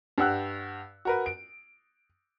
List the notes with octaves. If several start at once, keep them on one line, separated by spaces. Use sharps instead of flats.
G2 G4 F#5 E6 F#6
F#4 A#4 B4
D7